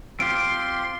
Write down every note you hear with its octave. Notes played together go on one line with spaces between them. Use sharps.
C4 F4 G4 C6 D7